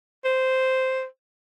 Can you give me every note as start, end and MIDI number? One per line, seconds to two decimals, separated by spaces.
0.25 1.05 72